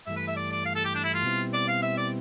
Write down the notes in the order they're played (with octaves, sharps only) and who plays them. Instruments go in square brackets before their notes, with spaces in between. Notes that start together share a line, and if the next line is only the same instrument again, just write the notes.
[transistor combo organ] G2 E3 A3 [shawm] E5
[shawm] B4
E5
D5
D5
F5
A4
G4
D4
E4
F4
[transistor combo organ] B2 G3 C4 E4
[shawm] D5
F5
E5
D5